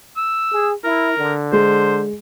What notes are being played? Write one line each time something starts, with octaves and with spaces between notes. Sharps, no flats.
E6
G#4
E4 A#4
D3
G#3 C5